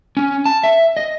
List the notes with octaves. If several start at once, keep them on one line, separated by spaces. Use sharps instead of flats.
C#4
A5
E5
D#5